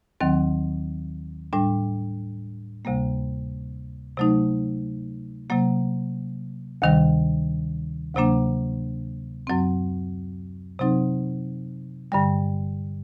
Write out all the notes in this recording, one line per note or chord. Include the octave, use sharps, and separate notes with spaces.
D#2 D#3 F#3 C4
A2 G3 D4
D2 C3 G3 A#3
C3 F#3 A3 D#4
C3 F#3 A#3
D2 C3 D#3 G3
D2 C3 F#3 A#3 D4
F#2 F#3 C4
C3 F#3 C4 D#4
G2 D3 G3